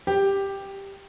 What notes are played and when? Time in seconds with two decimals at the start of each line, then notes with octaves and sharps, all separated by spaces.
0.07 G4